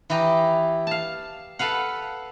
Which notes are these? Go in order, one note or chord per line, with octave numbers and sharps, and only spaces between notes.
E3 E4 G4 D#5 A#5
F5 A5
A4 B4 F5 F#5